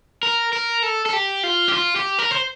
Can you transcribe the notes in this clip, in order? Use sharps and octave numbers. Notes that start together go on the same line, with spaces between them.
A#4
A#4
A4
A4
G4
F4
G4
F4
G4
A#4
C5